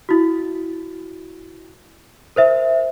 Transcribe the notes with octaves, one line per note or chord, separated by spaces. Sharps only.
E4 F#4
A#4 C5 E5